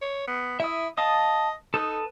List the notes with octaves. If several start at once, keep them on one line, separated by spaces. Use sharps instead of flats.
C#5
B3
E4 E5 D#6
D#5 F5 A5 D#6
D#4 A4 B4 D#6